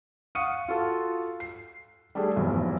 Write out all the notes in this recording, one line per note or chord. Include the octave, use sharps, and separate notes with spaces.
F5 F#5 C#6 D#6 C#7 D#7
F4 F#4 A4
C7
G3 A3 D4 G#4
F1 B1 E2 G#2